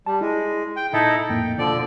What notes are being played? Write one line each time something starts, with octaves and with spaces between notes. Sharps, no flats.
G3 A5
G#3 E4
G5
A#2 D#4 E4 A4
F2 A2 A#3 G5
B2 D3 F3 D5